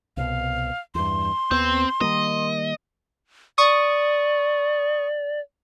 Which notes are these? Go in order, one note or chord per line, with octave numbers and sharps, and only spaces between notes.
C2 B2 F5
E2 G2 C6
D#2 B3 C4
D#3 G3 A#3 D#5
D5 C#6 D#6